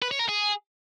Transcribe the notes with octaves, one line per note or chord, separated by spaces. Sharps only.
B4
C#5
A#4
G#4